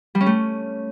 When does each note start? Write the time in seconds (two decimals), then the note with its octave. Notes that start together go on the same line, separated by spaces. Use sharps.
0.15 G3
0.21 C#4
0.26 A3